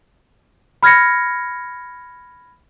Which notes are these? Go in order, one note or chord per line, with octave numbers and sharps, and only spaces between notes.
B5 F6 G#6 A#6 C#7